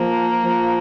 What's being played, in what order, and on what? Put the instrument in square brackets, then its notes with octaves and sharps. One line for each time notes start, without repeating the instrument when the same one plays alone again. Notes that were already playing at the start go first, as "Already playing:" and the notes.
Already playing: [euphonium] F3 [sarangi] A#3
[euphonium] F3